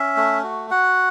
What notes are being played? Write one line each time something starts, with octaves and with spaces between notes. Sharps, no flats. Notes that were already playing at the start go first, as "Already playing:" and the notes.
Already playing: C#4 E5
A3
F#4
F#4 F#5